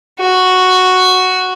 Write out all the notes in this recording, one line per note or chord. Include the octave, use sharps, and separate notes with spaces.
F#4